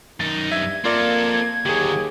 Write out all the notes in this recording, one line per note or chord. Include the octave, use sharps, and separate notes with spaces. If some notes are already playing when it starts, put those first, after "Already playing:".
F#2 D#3 D#4 A6
G2 E5 G#6
A#3 C4 F4 A4 A#4 D5
D#2 D3 F#3 G4 G#4